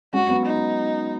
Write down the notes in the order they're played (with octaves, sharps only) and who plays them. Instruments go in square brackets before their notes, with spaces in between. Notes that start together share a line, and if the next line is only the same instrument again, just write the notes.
[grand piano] G#3 C#4 [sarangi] F#4
[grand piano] F#3 B3
[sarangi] D#4